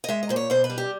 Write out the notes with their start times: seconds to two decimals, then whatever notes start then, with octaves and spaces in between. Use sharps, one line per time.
0.04 D#5
0.09 G#3 E5
0.23 D#5
0.29 A#2 C5
0.36 C#5
0.50 B2 C5
0.64 B4
0.70 G3
0.78 G4